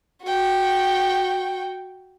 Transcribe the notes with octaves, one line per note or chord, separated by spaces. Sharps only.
F#4 G5